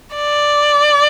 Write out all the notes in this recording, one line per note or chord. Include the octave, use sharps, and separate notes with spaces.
D5